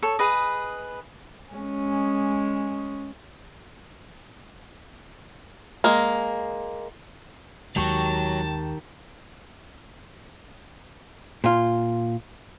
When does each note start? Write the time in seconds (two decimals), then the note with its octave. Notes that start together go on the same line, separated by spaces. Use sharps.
0.03 A4 C#5
0.19 G#4 B4 D#5
1.51 G#3 C#4
5.84 G#3 A#3
7.76 D#2 D#3 F#3 G#3 G4 A5 C#6
11.44 A#2 F4